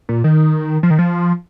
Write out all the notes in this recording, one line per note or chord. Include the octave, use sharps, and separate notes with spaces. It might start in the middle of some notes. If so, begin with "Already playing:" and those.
A#2
D#3
F3
D#3
F3